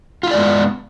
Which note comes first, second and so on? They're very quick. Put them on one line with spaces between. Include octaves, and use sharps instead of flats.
F4 E4 D5 G#3 B3